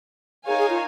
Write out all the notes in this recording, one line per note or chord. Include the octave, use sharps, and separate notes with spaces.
D#4 G#4 A#4 C#5 F5 G#5
G#4
F4